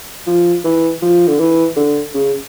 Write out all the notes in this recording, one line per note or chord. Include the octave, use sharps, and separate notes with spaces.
F3
E3
F3
D3
E3
D3
C#3